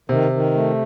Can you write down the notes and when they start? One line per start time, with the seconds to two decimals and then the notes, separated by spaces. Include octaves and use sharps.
0.09 C3 D#3
0.32 D#3
0.54 A3